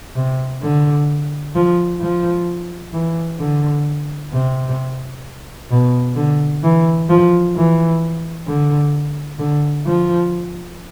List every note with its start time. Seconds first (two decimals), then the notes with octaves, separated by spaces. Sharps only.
0.16 C3
0.62 D3
1.56 F3
2.01 F3
2.93 E3
3.39 D3
4.33 C3
5.71 B2
6.16 D3
6.63 E3
7.09 F3
7.56 E3
8.47 D3
9.39 D3
9.86 F3